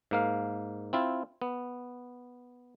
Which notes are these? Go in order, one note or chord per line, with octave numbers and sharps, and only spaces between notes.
G#2 A#3 F5
C4 E4 F4
B3